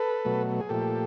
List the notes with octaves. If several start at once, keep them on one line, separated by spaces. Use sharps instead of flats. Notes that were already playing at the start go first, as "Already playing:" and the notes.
Already playing: A4 B4
B2 F#3 A3
G#4
A#2 F3 A3 G4 A4